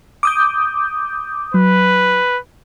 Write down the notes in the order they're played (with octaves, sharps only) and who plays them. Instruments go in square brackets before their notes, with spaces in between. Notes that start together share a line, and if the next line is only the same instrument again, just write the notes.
[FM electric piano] D6 D#6 G6
[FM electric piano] F#3 [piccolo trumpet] B4